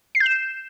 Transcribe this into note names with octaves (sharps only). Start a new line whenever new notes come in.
C7
G6
E7